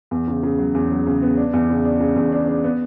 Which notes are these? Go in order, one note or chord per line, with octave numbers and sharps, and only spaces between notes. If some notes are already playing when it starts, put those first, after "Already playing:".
E2
C#3
C#3
F#3
E2
F#3
C#3
B3
D4
E2
C#3
D4
C#3
E2
D4
D4
B3